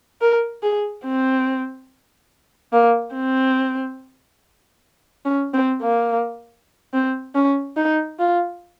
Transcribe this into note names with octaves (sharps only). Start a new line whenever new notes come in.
A#4
G#4
C4
A#3
C4
C#4
C4
A#3
C4
C#4
D#4
F4